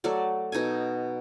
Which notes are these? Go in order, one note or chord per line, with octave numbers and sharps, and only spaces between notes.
F#3 A3 A4 D5
B2 D#4 A4 G#5